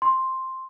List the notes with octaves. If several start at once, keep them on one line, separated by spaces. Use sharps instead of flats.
C6